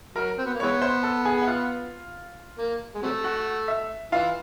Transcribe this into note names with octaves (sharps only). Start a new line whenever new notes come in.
F#3 A#4 A#5
C4
B3
A#3
E3 G#3 B3 C#5 C#6
C5 C6
A4 A5
G#4 G#5
F#5
F4 F5
A#3
G#3
C3 F#3 A3
F#4 F#5
E5
E3 F4 F5